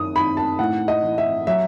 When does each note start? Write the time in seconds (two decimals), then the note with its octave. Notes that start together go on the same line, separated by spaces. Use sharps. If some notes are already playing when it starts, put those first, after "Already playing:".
Already playing: F#2 D#3 D#6
0.16 D#3 B5
0.37 A5
0.59 A2 F#5
0.88 D#5
1.03 E3
1.18 E5
1.47 F#3 E5